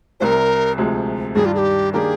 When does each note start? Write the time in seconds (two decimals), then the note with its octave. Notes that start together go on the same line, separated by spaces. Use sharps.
0.20 C2 C3 G3 A#4 C5
0.78 D2 C3 F3 G#3
1.35 G2 D#3 G3 D4 G#4
1.46 F4
1.55 G#4
1.58 G4
1.93 D#3 A#3 D4 G4 G#4 A#4 D5